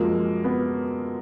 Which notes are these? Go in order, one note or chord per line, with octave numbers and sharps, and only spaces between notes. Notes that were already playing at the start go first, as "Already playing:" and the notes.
Already playing: F#2 F3 G#3 A#3
B3